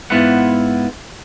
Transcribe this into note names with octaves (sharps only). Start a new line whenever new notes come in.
G#2 B3 E4 F4 B4 F#5